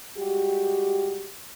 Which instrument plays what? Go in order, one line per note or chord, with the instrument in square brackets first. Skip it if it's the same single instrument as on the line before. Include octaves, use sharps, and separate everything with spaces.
[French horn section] G3 G#3 F#4 G4